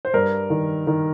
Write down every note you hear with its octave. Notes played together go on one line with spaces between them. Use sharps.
C5
G2 A#4
D#3
D#3